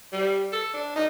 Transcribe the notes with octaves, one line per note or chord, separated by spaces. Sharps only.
G3
A4
D4
D#4